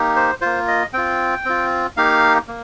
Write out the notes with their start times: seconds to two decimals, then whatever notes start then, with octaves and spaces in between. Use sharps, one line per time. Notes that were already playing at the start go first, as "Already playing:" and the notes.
Already playing: A#3 D#4 G4
0.16 C5
0.41 A#3 F4 C5
0.68 D#5
0.93 C4 F4 G5
1.45 C4 F4
1.97 A#3 D#4 G4 F5
2.48 A#3